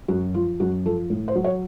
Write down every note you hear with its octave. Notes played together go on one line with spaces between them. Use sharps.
F#2 F#4
F3 F4
F#2 F#4
F3 A4
A2
C5
F#3
C#5